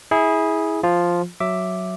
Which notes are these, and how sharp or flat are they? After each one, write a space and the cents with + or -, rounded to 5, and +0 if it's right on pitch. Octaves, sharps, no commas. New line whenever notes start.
E4 -25 G#4 +0
F3 +0 F4 +0
F#3 +0 E5 +5 D6 +0